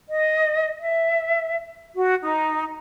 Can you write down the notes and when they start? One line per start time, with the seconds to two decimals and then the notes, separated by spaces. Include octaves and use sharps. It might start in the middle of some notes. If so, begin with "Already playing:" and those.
0.10 D#5
0.80 E5
1.94 F#4
2.22 D#4